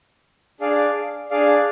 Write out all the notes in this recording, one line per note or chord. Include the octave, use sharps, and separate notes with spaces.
D4 G#4 D5 F5
D4 G#4 D5 F5